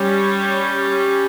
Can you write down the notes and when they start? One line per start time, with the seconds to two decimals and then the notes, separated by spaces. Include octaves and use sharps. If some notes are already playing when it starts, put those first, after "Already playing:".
Already playing: G3 C#4 C#5